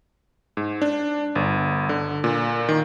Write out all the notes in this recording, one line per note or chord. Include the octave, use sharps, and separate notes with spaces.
G#2
D4
G1
D3
A#2
D#3